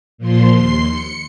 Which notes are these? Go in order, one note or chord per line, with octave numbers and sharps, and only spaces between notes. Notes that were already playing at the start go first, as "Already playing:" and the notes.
A#2 F3 C6
D#2 C6 C7
C#7